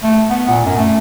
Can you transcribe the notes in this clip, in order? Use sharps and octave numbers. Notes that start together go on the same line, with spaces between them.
A3
B3
A#2
F#2
A3